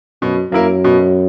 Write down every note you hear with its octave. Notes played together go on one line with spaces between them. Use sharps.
F#2 B2
F#2 A#3 E4 A#4
B2